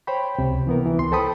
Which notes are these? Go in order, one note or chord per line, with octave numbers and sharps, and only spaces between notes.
C5 C#5 G5 B5
C#2 C3
E3 B3 A#4
E3
C#2 C6
A4 C5 G5 A5 B5 D#6